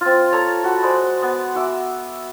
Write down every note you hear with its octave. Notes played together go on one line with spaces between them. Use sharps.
C4 F4
A4 C#5 A5 A#5
F#4 B5
G#3 C5 D5
B3
F#4 E5 D6